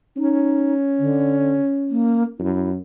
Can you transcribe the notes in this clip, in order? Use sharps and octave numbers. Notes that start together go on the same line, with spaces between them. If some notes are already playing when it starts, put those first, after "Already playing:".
C#4 D#4
D3
A#3
F#2 E4